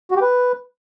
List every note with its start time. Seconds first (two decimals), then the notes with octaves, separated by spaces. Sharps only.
0.11 F#4
0.16 G4
0.22 B4